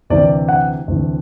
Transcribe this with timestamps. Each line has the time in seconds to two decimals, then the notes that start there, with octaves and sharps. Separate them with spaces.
0.10 D2 C3 E3 D5
0.49 F#5
0.88 D2 C3 E3